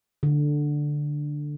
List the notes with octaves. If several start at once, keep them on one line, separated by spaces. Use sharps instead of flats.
D3